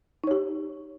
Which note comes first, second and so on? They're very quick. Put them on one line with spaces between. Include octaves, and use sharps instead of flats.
D#4 C#5 G4